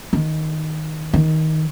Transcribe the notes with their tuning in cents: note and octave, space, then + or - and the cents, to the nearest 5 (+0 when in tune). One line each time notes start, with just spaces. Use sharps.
D#3 +5
D#3 +15